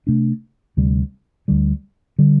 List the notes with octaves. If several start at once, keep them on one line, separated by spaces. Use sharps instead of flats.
C3 A3 D4
D2 C3 G3
D2 D3 G3
D3 G3